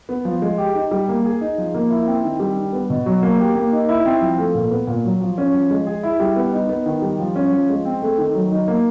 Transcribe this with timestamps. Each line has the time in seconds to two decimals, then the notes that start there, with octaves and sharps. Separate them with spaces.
0.09 B3
0.25 F3
0.42 G#3
0.58 G4
0.75 D#4
0.91 G3
1.08 A#3
1.25 G#4
1.41 D#4
1.58 F3
1.74 A#3
1.90 E4
2.07 C4
2.24 D#3
2.40 G3
2.56 D4
2.73 B3
2.90 B2
3.06 F#3
3.23 A#3
3.39 G4
3.55 A#3
3.72 D#4
3.89 E4
4.05 C4
4.21 F3
4.38 A3
4.55 A#2
4.71 B3
4.87 A#2
5.04 F#3
5.21 F3
5.38 C#4
5.54 F3
5.71 G#3
5.87 G#4
6.03 E4
6.20 G3
6.36 B3
6.53 D#4
6.69 B3
6.86 D#3
7.02 G3
7.19 F3
7.36 C#4
7.52 F3
7.69 G#3
7.85 C4
8.02 A3
8.18 D#3
8.35 F#3
8.52 D#4
8.68 A#3